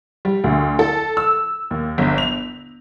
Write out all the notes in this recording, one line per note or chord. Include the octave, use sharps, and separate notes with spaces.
G3
D2
A4
E6
D#2
G1
F7